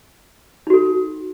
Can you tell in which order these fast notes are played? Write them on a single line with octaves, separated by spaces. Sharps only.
D#4 F#4 A4